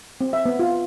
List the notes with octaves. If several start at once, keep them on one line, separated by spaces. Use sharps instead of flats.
C4
E5
B3
F4